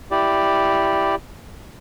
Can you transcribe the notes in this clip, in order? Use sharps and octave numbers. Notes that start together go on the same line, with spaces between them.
E4 G4 D5